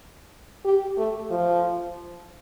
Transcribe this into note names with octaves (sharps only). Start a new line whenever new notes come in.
G4
A3
F3